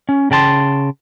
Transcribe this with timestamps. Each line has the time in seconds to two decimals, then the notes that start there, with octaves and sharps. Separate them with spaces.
0.09 C#4
0.31 C#3 G5 A5 C6